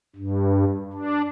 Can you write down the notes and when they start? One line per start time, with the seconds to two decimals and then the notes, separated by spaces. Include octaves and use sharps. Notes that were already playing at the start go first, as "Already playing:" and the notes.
0.16 G2
0.93 D4